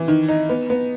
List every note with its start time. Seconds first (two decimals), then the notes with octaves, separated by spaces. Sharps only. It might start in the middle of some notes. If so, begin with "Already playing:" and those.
Already playing: E3
0.08 D#3
0.28 D#4
0.49 B3
0.70 B3